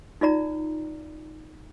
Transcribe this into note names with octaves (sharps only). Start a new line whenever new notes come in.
D#4 F4 D5 A#5